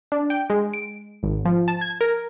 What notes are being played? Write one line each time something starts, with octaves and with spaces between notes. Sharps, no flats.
D4
G5
G#3
D7
G#1
F3
A5
G#6
A#4